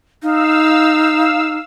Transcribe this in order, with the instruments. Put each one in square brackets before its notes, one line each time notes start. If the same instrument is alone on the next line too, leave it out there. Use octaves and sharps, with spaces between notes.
[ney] D#4 [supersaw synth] F5 E6